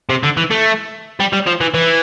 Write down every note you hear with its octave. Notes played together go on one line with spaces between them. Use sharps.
C3
D3
E3
A3
G3
G3
F3
E3
E3